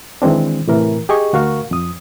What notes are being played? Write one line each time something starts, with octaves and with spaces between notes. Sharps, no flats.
D#3 E3 G#3 C4 D4
A2 C3 E3 A#4
G4 G#4 D#5 C#6
D2 F#4 A#4 F5 C#6
F2 D#6